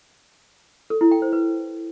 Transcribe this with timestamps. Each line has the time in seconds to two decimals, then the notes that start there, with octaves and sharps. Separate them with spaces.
0.90 A4
1.01 E4
1.11 G5
1.22 C5
1.33 B4